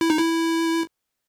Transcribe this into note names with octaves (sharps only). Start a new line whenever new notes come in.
E4
D#4
E4